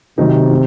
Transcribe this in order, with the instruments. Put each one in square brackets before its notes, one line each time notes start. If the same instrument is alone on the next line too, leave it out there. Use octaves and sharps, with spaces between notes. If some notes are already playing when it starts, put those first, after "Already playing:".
[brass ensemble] C3 [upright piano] D#3 F#3 C4 D#4
[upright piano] D#3